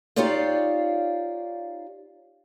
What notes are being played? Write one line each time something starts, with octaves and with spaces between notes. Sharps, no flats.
D#4 F4 G4 C#5 D5 F5